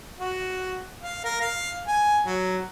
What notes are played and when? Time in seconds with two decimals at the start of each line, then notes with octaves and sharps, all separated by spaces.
0.19 F#4
1.03 F5
1.24 A#4
1.41 F5
1.87 G#5
2.25 F#3